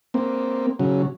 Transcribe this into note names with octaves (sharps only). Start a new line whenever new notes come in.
A#3 C4
C#3 F#3